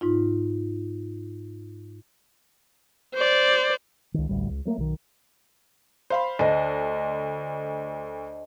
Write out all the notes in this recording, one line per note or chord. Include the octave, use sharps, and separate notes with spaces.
G#2 D#4 F4
C5 D5
C#2 D#3
A1 D2 G2 G3
C#2
F#3 A3 A#3
B1 D#3
C5 F5 B5
D2 D4 C5 D#5